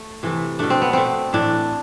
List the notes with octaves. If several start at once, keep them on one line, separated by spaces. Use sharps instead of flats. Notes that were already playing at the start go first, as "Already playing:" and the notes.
Already playing: A3
C3 E3 A3
B2 A3 D4
C4
B3
B2 A3 C4
A2 E3 A3 D4